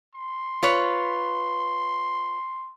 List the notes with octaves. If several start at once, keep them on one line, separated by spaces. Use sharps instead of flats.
C6
F4 B4 C#5